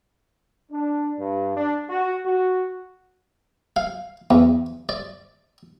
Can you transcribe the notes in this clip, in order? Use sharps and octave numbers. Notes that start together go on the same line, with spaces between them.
D4
G2
D4
F#4
F#4
F5
E2
D5